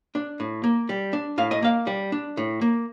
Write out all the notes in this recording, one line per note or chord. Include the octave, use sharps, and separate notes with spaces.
D4
A2
A#3
G3
D4
A2 F5
D#5
A#3 F5
G3
D4
A2
A#3